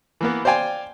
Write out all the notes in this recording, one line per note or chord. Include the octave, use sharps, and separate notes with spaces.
E3 A#3 B3
C5 D5 F5 G5 G#5